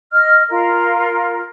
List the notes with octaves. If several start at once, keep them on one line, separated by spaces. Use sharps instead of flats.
D#5 F6
F4 A#4